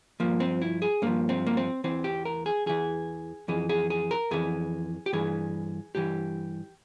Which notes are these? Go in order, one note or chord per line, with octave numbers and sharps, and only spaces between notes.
G2 F3 A#3
C4
E4
G#4
G2 F3 A#3
C4
A#3
C4
E2 E3 C4
G4
A#4
G#4
E2 E3 G#4
F2 E3 G#4
G#4
G#4
A#4
F2 E3 G#4
G4
G2 E3 G#4
G2 E3 G4